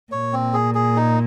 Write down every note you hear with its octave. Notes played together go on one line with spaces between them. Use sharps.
A#2 C#5
C4
G#4
G#4
D#4